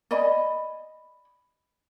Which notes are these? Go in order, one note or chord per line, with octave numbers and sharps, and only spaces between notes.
D5 D#5 G#5 B5